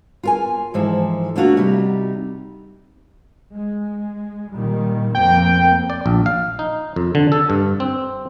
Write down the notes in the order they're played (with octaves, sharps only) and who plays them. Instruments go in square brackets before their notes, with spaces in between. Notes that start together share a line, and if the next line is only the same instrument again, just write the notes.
[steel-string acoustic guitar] F4 A#4 G#5
G#2 E3 F3 A4
A3 A#3 D4 F4 F#4 A#4
C3 G3 D#4
[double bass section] G#3
A#2 D#3 G3
[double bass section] F2 A#3 C4 [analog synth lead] G5
[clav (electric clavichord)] D5
A#1
F5
D#4
F2
D3
A4
G2
C4